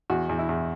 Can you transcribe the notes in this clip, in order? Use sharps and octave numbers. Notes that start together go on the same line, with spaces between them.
E2 F#4
E2
E4
E2